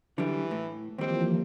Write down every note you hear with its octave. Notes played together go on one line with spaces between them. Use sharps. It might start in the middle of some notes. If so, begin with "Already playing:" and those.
D3 E3 F#3 G3
A2
D#2 E3 F3 G3 A#3 C4